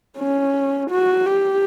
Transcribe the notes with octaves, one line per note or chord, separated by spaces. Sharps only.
C#4
F#4
G4